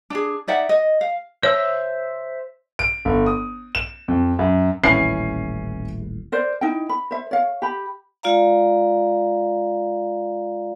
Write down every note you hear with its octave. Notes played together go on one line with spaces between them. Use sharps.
D4 G#4
D#4 D5 E5 F#5
D#5
F5
C5 C#5 E5 E6
D7
G1
D#6
E7
F2
F#2
D#1 A1 E3 C#4 C7
A#4 C5 D5
D#4 E4 G5
B5
C5 E5
C#5 F5
G4 B5
G#3 F4 D5 F5 A#5